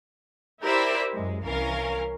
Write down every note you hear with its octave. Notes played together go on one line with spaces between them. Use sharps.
E4 G4 A#4 C5 D5 E5
F#2 G#3
C2 E3 C#4 A#4 F5